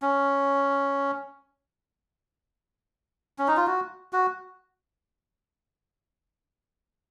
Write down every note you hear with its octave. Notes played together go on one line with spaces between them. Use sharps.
C#4
C#4
D#4
F4
F#4
F#4